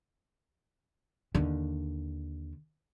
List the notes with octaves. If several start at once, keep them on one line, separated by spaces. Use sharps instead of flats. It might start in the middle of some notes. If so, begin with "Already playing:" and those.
D#2 D3